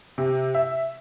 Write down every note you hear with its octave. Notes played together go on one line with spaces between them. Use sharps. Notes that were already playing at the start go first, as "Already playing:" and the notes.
C3
E5